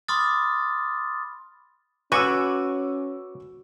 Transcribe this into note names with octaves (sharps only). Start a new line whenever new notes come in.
B5 C6 D6 D#6 F6 A6
C#4 F#4 B4 G#5 C#6 D6 E6